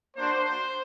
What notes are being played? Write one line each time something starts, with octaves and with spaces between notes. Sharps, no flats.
A#3 D4 F#4 C5